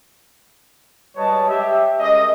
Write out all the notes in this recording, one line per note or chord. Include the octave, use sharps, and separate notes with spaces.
G3 G#3 B4 C#5 D#5 A5
G4 E5
G#3 C#4 A#4 D#5